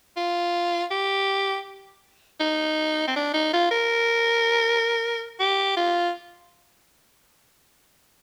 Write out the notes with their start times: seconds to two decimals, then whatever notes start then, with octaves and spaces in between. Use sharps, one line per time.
0.17 F4
0.91 G4
2.40 D#4
3.08 C4
3.16 D4
3.34 D#4
3.53 F4
3.71 A#4
5.40 G4
5.77 F4